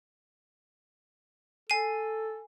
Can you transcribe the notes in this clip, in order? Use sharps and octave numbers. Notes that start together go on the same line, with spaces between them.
A4 G#5 C7 D#7